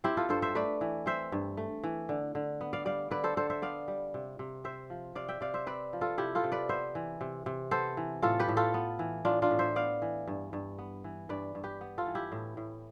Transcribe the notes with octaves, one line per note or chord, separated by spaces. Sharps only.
C4 E4 G4
F4 A4
G2 A4 C5
C5 E5
A3 B4 D5
E3
C4 C5 E5
G2
A3
E3
D3
D3
B3
D5 F5
G3 D5 F5
D3 B4 D5
A4 C5
D3 A4 C5
C5 E5
B3 D5 F5
G3
C3
C3
C4 C5 E5
F3
C3 D5 F5
E5 G5
C3 D5 F5
C5 E5
C4 B4 D5
F3
F4 A4
C3 E4 G4
F4 A4
C3
B4 D5
B3 C5 E5
E3
C3
C3
B3 A4 C5
E3
A2 F4 A4
G4 B4
A2
F4 A4
B3
E3
A2 D4 F4
D4 F4
A2
C5 E5
B3 D5 F5
E3
G2
G2
B3
E3
G2 B4 D5
G2
G4 B4
B3
F4 A4
E3
E4 G4
A2
A2